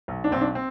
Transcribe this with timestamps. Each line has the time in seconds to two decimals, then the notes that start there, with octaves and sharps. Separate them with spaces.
0.08 B1
0.24 D4
0.32 B1 C4
0.41 D4
0.55 C4